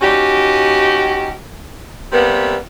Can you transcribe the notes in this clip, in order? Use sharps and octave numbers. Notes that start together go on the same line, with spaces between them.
C#4 D#4 F#4 G4
C3 G3 A#3 B3